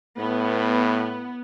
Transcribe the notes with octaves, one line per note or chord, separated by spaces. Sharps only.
A2 B3